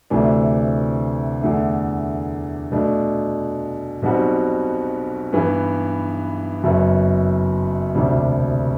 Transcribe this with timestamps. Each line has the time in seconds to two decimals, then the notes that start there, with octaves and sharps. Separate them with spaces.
0.10 D2 C3 E3 A3 D4
1.41 E2 D3 A3 D4
2.72 B2 A3 D4
4.02 B1 B2 G3 C4 F#4
5.33 G2 E3 B3
6.64 F#1 F#2 F#3 B3
7.94 E1 D2 C3 G3 D4